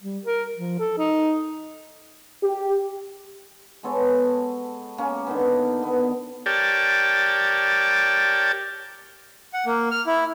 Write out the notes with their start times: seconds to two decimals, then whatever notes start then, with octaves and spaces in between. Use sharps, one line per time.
0.02 G3
0.25 A#4
0.57 F3
0.80 A4
0.98 D#4
2.43 G4
3.83 G#3 B3 A4 C#5
4.98 G#3 A#3 C#4
5.26 D3 D#3 B3
5.83 B3
6.46 G4 A#4 C#5 D5 G5 A5
9.54 F#5
9.66 A#3
9.91 F6
10.06 E4